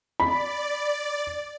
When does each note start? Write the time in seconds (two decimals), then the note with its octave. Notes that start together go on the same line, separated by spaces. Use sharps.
0.20 D5 B5